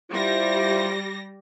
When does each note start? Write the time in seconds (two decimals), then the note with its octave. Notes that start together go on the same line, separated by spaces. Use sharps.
0.12 G3 E4 F4 C5 A#6